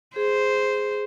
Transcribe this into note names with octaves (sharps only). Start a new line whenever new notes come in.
G#4 C5